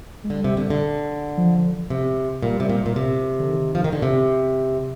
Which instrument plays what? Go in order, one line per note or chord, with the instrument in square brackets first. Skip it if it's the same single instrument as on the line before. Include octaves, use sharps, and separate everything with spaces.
[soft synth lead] G#3
[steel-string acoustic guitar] D3 [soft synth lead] G3
[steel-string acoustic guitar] C3
D3
D3
[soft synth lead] F3
[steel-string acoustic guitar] C3
[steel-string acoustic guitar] A#2 [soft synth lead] G3
[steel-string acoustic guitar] C3
A#2
A#2
C3
[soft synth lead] D3
D#3
[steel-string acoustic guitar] F3
D#3
D3
C3